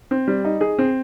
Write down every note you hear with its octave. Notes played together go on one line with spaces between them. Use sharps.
C4
G3
D#4
G#4
C4